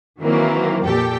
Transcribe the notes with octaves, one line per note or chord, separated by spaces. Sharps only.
D#3 E3 F#3 A#3 C4
F2 A#2 G4 A4 G5